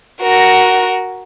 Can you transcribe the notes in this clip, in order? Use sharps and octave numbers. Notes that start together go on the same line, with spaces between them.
F#4 A#4